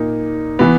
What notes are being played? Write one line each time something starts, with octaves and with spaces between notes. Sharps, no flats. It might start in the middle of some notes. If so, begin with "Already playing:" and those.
Already playing: A#2 A#3 D#4
E3 B3